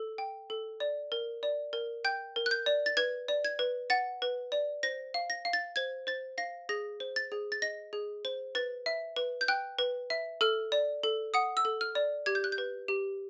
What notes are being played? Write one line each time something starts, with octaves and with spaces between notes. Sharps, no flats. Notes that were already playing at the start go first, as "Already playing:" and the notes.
Already playing: A4
G5
A4
D5
A#4
D5
A#4
G5 G6
A#4
F#6
G6
D5
A6
B4 G#6
D5
G#6
B4
F#5 A6
B4
D5
C5 A#6
F5
A#6
F5
A6
C5 G#6
C5 A6
F5 A#6
G#4 A#6
C5
A6
G#4
A6
D#5 A#6
G#4
C5
B4 A6
E5
B4
G6
G5 F#6
B4
E5
A4 F6
D5
A4
F#5 D#6
E6
A4
F6
D5
G4 G#6
G6
F#6
G6
B4
G4